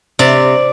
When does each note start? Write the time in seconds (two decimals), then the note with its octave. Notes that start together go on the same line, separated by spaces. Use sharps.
0.19 C3 D5